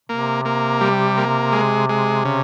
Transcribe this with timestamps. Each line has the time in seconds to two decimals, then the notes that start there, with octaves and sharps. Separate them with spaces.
0.09 C3 A#3
0.45 A#3
0.81 G3
1.17 A#3
1.52 G#3
1.89 G#3
2.25 C#3